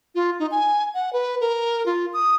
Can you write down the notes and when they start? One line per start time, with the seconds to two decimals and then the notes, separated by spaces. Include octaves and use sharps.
0.15 F4
0.39 D#4
0.51 G#5
0.94 F#5
1.13 B4
1.41 A#4
1.86 F4
2.13 D#6